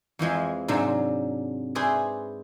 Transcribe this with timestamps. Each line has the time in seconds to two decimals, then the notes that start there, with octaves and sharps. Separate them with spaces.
0.19 F2 E3 F3 G#3
0.68 G#2 C3 F#3 D4
1.75 G#4 B4 C5 D5 E5